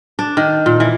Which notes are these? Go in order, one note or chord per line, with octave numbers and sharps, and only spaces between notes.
D4
D#3
A#2
E3